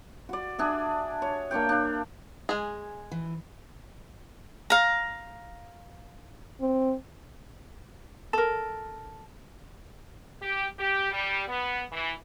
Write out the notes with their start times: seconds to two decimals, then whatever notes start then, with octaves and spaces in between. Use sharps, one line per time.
0.29 F#4 D5
0.58 D4 G#4 E5
1.22 C#5
1.51 A#3 D4 C#5 G5
1.69 D4 F5
2.49 G#3 G#4
3.12 E3
4.70 F5 A#5
6.60 C4
8.33 A4 A#4
10.42 G4
10.79 G4
11.11 G3
11.48 B3
11.92 E3